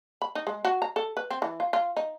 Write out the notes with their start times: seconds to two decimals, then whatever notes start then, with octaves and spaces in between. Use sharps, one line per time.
0.22 B5
0.35 D#4
0.47 G#3
0.65 F#4
0.82 A#5
0.96 A4
1.17 B4
1.31 C4
1.42 E3
1.60 F4
1.73 F4
1.97 D#4